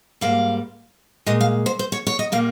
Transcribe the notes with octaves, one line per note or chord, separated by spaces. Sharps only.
G#2 G3 A#3 F5
A#2 G#3 D#5
F5
C5
C5
C#5
C#5
D#5
A#2 G3 A#3 F5